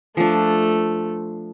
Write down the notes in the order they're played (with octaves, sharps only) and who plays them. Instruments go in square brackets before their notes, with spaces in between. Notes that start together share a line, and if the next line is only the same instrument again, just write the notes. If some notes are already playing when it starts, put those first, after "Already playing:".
[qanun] F3 D4 [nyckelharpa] A3